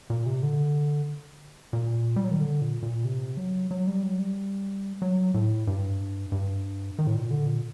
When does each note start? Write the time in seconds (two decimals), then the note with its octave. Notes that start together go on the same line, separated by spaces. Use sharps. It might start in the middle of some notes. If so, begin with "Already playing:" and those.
0.10 A#2
0.26 C3
0.43 D3
1.73 A#2
2.16 G3
2.24 F#3
2.31 D#3
2.40 D3
2.62 A#2
2.82 A#2
3.05 C3
3.37 F#3
3.71 F#3
3.87 G3
4.03 F#3
4.19 G3
5.02 F#3
5.34 A2
5.67 G2
6.32 G2
6.98 D#3
7.07 A2
7.15 A#2
7.31 D3
7.46 A#2